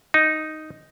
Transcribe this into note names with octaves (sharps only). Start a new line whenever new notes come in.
D#4